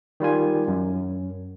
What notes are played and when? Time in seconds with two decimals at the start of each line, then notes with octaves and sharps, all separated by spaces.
0.20 D#3 G3 F4 G#5
0.68 F#2